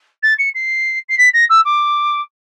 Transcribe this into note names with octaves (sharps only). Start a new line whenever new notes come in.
A6
C#7
C7
C7
B6
A#6
E6
D6